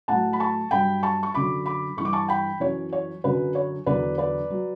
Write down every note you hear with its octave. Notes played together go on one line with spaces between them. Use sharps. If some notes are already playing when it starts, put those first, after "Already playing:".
A2 F#3 F#5 A5
B5
A5 C#6
G2 F#3 G5 B5
A5 C#6
C#6
F#2 D3 F#3 B5 D6
B5 D6
G2 E3 C#6
D6
A5 C#6
G5 B5
F#2 E3 C#5
C#5
F#2 D3 F#3 B4
C#5
E2 D3 F#3 B4 D5
B4 D5
F#3